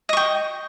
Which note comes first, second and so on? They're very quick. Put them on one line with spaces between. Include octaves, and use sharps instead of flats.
D#5 C#6 G5